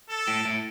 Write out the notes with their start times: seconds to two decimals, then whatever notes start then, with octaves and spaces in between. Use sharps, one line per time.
0.10 A4
0.28 A2
0.45 A2